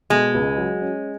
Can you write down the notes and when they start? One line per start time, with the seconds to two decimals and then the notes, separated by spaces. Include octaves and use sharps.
0.10 B2 G#3
0.34 C#2
0.57 F#3
0.81 C#4